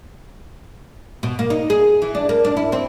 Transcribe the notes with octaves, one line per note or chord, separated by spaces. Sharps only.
B2
A#3
D#4
G#4
E3
D4
A#3
D4
E4
C4